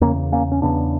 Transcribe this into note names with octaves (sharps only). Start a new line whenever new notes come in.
E2 C#3 A#3 C#4
A#3 C#4
C#4
E2 C#3 B3 D4